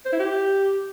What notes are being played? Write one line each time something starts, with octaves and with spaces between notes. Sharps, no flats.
C5
E4
G4